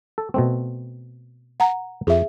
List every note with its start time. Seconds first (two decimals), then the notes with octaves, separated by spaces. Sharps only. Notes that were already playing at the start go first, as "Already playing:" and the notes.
0.18 A4
0.34 B2 A3 C4
1.60 F#5 A#5
2.07 F2 G#4 E5